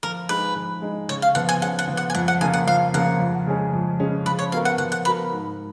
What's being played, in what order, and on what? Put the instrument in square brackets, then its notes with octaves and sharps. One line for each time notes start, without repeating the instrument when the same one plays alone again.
[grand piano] F3 [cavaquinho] A#4
[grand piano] G#3 D#4 [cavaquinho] B4
[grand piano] F3
G#3 D#4
[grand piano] C#3 [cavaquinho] C#5
[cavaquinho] F5
[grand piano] F3 B3 [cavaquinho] F#5
[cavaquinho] G#5
[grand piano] C#3 [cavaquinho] F#5
[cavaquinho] F#5
[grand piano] F3 B3
[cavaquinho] F#5
G#5
[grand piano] F2 [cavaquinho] F#5
[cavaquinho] F#5
[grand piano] C#3 F3 A#3 [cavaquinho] G#5
[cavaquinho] F#5
[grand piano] F2 [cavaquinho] F5
[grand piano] C#3 F3 A#3 [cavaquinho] F#5
[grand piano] F2
C#3 G#3 C#4 G#4
F2
C#3 G#3 C#4 G#4
[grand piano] F3 [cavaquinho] B4
[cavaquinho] C#5
[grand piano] B3 F#4 A#4 [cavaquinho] F5
[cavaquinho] F#5
[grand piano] F3 [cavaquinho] F#5
[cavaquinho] F#5
[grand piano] B3 F#4 A#4 [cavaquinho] B4
[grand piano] G#2